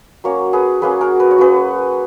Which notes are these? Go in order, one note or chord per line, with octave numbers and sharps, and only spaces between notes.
F#3 A#3 C#4 A#4 C#5
G#4 B4
F#3 A#3 C#4 G#4 B4
F#4 A#4
B4
C#5
F#3 A#3 C#4 G#4 B4